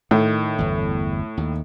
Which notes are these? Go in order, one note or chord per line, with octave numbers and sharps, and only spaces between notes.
A2 D#3
G1 E2
D#2